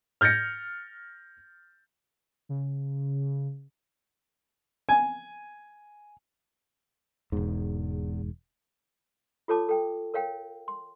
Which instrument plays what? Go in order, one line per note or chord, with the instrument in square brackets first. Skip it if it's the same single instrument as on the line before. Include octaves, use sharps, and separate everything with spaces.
[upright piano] F6 G6 A6 A#6 C#7
[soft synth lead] C#3
[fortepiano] G#5
[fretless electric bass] E1 G#2 [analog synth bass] E2
[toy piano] F4 A4 C#5 A5 D6
A4 G5
A#4 C#5 F5 G5
C6